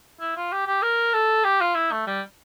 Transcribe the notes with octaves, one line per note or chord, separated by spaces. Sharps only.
E4
F4
G4
G4
A#4
A4
G4
F4
E4
A3
G3